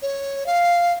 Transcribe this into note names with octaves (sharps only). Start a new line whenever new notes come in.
C#5
F5